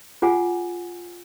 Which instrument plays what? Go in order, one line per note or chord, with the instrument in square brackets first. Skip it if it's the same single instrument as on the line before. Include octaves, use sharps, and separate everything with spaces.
[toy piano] F4 G#4 F#5 G#5